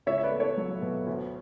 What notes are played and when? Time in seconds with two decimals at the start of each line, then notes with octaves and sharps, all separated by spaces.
0.06 C#2 C#5 E5
0.18 E5
0.23 B4 D5
0.31 A3
0.40 A4 C#5
0.57 F#3
0.82 B2
1.06 D2